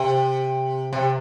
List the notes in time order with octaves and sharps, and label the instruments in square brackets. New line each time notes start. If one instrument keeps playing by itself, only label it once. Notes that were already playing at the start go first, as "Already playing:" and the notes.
Already playing: [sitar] C3
C3